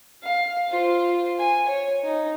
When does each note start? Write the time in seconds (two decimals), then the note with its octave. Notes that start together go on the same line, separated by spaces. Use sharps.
0.22 F5
0.69 F4 C5
1.38 G#5
1.68 C#5
2.03 D#4